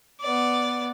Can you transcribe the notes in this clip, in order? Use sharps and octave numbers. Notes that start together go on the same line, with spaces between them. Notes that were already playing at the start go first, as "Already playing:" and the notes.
B3 D5